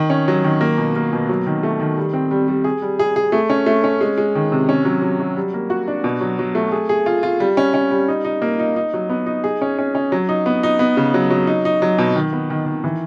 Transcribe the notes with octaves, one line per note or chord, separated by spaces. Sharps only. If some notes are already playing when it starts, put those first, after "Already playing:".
Already playing: D#3
C#4
F#3
D#3
A#3
B2
A#3
B2
F#3
D#3
A3
D#3
G3
C4
G3
G3
G#4
G3
G#4
G#4
A3
C#4
A3
C#4
G#3
G#3
D#3
C3
C#4
F#3
F#3
F#3
G3
A#3
F#4
D4
B2
F#3
F#3
A3
G#4
G#4
F4
F4
G3
C#4
C#4
G3
D#4
D#4
A#3
D#4
D#4
F#3
B3
D#4
G#4
C#4
C#4
C#4
F#3
D#4
B3
D#4
B3
C#3
F#3
F#3
D#4
D#4
F#3
B2
D#3
B3
D#3
D#3
E3